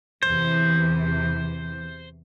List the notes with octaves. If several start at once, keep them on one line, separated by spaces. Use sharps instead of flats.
E2 C3 E3 C5